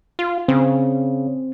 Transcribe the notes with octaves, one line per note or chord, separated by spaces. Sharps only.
F4
C#3 C4